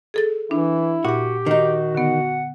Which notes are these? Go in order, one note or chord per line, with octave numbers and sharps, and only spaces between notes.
G#4 A4 A6
E3 D4 E4
A#2 F#4 G4 F#5
D#3 D#4 F#4
D3 B3 F#5